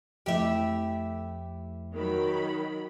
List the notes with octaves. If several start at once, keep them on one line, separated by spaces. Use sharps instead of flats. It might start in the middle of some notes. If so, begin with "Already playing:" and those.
F2 A3 E4 G4 E5
D#3 F#3 B5